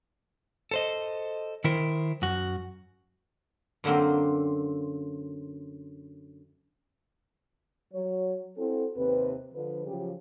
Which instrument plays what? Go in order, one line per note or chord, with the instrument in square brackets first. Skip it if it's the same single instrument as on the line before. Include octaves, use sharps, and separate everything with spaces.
[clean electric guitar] A4 C5 D#5
D#3 E4 A#4 C5
F#2 F#4
[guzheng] F#2 D3 F#3 A#3 C4
[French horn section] F#3 C#5
C4 E4 F#4 A4
D#2 C3 C4 B4
D3 F3 B4
C#3 F3 F#3 G4